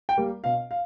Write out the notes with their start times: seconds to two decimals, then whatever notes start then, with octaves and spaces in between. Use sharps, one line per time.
0.09 G5
0.17 G3 A#3
0.44 B2 F5
0.71 F5